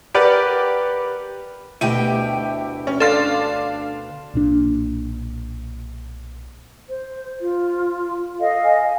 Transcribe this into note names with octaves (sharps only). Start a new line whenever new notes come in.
G4 A#4 B4 D5 F#5 G5
D2 B2 E4 G4 G5 D#7
C#4
D4 A4 D5 F5 C6 A6
B1 A#2 D4
C5
F4
A4 D#5 F5
G#5